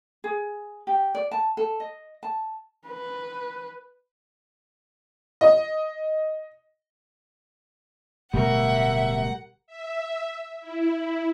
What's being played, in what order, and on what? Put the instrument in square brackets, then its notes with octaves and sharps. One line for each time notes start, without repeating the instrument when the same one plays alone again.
[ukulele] G#4
G4
D5
A5
A4
D#5
A5
[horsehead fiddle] B4
[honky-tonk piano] D#5
[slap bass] D1 B2 A3 [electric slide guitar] G3 A#4 [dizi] E5 [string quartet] F#5
[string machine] E5
E4